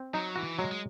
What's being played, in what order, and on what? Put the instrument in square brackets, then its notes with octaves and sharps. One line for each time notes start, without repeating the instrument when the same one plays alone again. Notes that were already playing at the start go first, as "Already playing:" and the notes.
Already playing: [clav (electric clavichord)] C4
[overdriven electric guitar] F#3 [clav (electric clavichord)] D#4
[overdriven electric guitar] E3 [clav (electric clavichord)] F#4
[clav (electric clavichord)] F#3 [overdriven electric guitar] G#3
[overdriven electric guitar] G#3